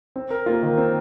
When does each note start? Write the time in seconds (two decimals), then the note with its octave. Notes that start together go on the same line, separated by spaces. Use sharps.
0.16 C4
0.31 A#4
0.46 A#3 F4
0.63 D#3
0.78 C4